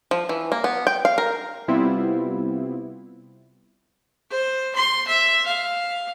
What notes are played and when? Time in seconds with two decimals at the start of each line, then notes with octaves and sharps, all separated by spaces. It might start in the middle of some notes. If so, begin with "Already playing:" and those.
0.11 F3
0.29 E3
0.52 A#3
0.64 B3
0.87 G5
1.05 F5
1.18 A#4
1.68 C3 G3 B3 C4 E4 F4
4.30 C5
4.75 C6
5.07 E5
5.46 F5